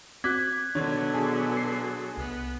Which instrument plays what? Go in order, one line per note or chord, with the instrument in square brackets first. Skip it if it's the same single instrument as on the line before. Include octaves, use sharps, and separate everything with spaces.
[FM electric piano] C4 F#4 [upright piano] D6 F#6 B6 [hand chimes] G#6
[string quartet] B2 D3 F#3 [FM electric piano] D#3 D4 [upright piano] C#5
[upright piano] G#4 [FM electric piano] A5 C#6
[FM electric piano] C7
[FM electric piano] C2 [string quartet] B3